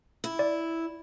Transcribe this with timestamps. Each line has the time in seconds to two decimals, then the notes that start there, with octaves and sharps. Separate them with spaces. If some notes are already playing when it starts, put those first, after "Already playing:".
0.24 E4
0.39 D5